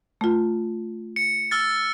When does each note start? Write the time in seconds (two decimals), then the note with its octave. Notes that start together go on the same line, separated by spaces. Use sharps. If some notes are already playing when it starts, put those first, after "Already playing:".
0.21 A3 F4
1.16 C#7
1.51 E6 F6 A6